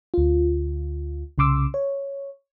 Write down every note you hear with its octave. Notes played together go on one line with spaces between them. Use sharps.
D2 F4
C2 C#3 C6 D6 E6
C#5